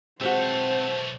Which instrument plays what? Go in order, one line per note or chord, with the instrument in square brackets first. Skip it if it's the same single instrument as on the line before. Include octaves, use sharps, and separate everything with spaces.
[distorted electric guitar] B1 A3 [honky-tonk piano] G#3 F#4 [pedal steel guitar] C4 [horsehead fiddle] C5 A5